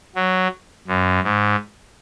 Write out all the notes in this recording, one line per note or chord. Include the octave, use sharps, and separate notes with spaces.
F#3
F#2
G#2